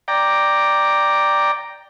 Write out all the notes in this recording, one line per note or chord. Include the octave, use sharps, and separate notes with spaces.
D5 G5 A#5